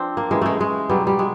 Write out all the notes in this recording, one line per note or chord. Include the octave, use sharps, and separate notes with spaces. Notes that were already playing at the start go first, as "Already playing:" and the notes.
Already playing: F3 C4 D4
A#3
C#3 E3 G3 G#3
G#3 A3
G#3
B2 F#3 G3
G3
G#3